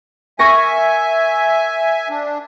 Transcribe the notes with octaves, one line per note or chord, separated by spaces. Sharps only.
A#4 E5 G#5 C#6 A#6
D4